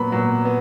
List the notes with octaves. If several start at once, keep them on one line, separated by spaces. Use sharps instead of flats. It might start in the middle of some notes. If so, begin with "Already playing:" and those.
Already playing: A#2 F#3 B3 B5
A#2 F#3 B3
B3